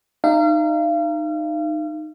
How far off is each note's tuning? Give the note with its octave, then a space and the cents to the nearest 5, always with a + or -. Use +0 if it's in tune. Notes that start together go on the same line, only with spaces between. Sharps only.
D#4 -20 F5 -35